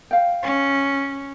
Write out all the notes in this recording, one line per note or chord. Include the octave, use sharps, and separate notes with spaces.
F5 G5
C#4